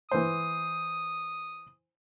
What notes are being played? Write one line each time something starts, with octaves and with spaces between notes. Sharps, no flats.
E3 C5 D#6